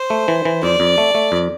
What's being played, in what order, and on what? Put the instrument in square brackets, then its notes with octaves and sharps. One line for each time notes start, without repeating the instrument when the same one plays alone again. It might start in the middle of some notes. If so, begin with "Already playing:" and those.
Already playing: [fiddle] C5
[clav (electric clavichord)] A3
E3
E3
[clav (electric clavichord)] F2 [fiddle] D5
[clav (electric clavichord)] F2
A3
A3
F2